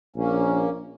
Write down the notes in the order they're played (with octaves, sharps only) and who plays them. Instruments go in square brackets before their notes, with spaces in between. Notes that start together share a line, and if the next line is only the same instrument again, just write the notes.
[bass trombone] A#1 [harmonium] A#3 C#4